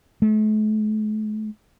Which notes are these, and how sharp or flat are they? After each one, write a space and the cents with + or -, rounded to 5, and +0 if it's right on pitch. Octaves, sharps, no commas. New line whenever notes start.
A3 -45